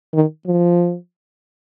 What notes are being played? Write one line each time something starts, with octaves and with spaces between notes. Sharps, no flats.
D#3
F3